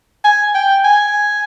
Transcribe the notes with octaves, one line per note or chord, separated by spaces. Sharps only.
G#5
G5
G#5